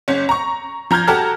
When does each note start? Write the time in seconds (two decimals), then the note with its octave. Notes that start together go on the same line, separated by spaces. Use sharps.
0.08 F#1 C#4
0.29 A#5 C#6
0.91 F3 A#5 F6 G6 G#6
1.08 F#4 G4 A4 A5 A#5 F6